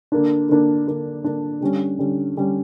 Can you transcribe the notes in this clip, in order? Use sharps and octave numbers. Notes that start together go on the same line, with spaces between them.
D3 A#3 D4
D3 A#3 D4
D3 A#3 D4
D3 A#3 D4
D3 G3 C#4
D3 G3 C#4
D3 G3 C#4